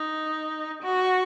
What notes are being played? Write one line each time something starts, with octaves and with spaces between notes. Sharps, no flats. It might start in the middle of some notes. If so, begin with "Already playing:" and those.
Already playing: D#4
F#4